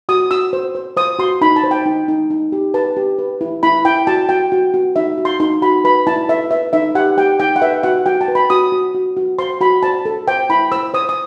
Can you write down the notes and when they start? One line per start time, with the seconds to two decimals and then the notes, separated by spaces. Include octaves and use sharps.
0.09 F#4 D#6
0.31 F#4 E6
0.53 C5
0.75 C5
0.97 C5 D#6
1.19 F#4 C6
1.41 D#4 B5
1.56 A5
1.64 C5
1.71 G5
1.86 D#4
2.08 D#4
2.30 D#4
2.52 G4
2.74 B4 A5
2.97 G4
3.19 B4
3.41 E4
3.63 E4 B5
3.85 E4 G5
4.07 F#4 A5
4.29 F#4 G5
4.52 F#4
4.74 F#4
4.96 D#4 E5
5.18 F#4
5.25 C6
5.40 D#4 C6
5.62 F#4 B5
5.84 B4 B5
6.07 E4 A5
6.29 B4 E5
6.51 B4 E5
6.73 D#4 E5
6.95 G4 F#5
7.17 G4 G5
7.40 D#4 G5
7.56 F#5
7.62 B4 E5
7.83 F#4 F#5
8.06 F#4 G5
8.21 A5
8.28 B4
8.35 B5
8.50 F#4 D#6
8.72 F#4
8.94 F#4
9.17 F#4
9.39 C5 C6
9.61 F#4 B5
9.83 C5 A5
10.05 A4
10.28 C5 G5
10.50 E4 B5
10.72 C5 E6
10.94 C5 D#6
11.09 D#6